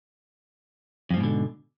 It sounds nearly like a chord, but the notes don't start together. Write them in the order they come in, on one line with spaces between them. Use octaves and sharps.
F2 F3 G#2 B2 D3